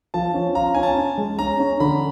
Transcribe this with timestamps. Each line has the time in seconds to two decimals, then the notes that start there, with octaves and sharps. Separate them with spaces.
0.14 F3 A5
0.34 C#4
0.55 F4 A#5
0.75 C#4 G#5
0.83 A5
0.97 C#4
1.18 G#3
1.39 C#4 A#5
1.59 C#4
1.80 D3 B5